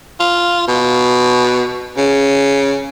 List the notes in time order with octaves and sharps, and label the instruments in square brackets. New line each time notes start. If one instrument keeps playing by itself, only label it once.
[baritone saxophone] F4
B2
C#3